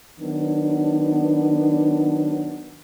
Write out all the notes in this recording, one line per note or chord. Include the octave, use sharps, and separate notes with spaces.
D#3 F#3 B3 D4